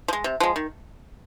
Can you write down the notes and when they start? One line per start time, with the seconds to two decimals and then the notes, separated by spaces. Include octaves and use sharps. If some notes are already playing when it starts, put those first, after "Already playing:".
0.08 F3
0.13 G#3
0.24 C3
0.40 F3 G#3
0.56 D#3